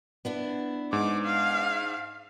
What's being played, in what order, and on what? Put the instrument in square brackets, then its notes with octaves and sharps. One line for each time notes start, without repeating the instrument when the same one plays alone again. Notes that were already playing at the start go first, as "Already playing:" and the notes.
[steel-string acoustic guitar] B3 D4 E4
[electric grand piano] G#2 [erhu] D6
[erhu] F5